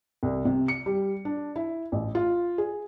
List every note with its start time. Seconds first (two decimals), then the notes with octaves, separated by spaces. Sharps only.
0.23 C2
0.45 C3
0.68 C#7
0.86 G3
1.25 D4
1.56 E4
1.92 A1
2.15 F4
2.58 G#4